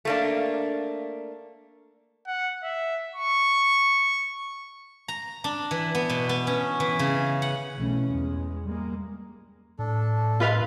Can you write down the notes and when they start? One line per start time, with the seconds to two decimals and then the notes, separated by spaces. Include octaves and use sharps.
0.05 A3 A#3 D4
2.27 F#5
2.63 E5
3.15 C#6
5.08 A#5
5.44 D4
5.71 E3
5.95 B3
6.10 B2
6.29 B3
6.47 C#4
6.80 E3
6.99 C#3
7.42 F#5
7.77 B1 E3 A3 C#4
8.09 E2 G#3
8.65 G3 G#3 A#3
9.79 A2 D4 A4
10.40 F4 B4 F5